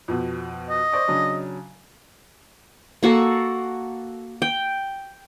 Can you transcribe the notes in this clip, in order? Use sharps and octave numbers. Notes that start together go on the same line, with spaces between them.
F2 B2
D#5
C5 D5 C#6
C#3 F#3 D4
A#3 F#4 A4
G5